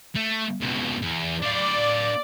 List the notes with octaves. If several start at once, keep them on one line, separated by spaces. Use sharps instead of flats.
A3
C#2 B2
E2
D4 D5 F5